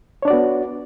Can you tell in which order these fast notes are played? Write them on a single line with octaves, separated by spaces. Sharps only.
C#5 D4 D5 F#4 B3